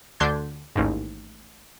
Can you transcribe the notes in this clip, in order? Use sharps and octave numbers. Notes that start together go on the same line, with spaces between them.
D2 D3 D4 C6 G6 G#6
A1 D#2 G#2